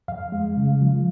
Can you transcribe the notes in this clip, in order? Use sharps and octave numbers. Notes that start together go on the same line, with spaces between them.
F2 F5
G#3
C#3
F3